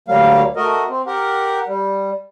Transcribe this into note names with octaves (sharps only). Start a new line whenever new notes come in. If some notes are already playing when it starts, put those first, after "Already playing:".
D2 F#3 G3 A#3 F5
A3 F#4 A#4 D#5
C4
G4 A#4 F#5
G3